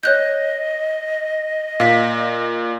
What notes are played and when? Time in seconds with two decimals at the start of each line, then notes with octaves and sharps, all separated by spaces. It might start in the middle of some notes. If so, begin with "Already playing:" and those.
0.03 C#5 D#5 F#6 G6
1.80 A#2 F5 B6